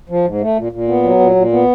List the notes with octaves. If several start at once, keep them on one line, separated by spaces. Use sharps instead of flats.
F3
G#2
A3
A#2
A#2
B3
F#3
A#2
A#2
B3